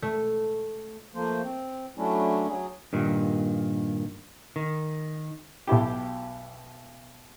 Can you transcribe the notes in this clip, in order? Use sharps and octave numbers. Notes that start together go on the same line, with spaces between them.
A3
F3 A3 A#3 C5
C4
F#3 A3 C#4 D4 E4
F#3 G#4
G2 A#2 D#3
D#3
B1 B2 E4 G4